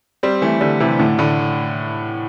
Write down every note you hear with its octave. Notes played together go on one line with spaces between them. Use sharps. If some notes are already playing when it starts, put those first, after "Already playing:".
G3 C4
E3 A3
D3 G3
C3 E3
A2 D3
A2 D3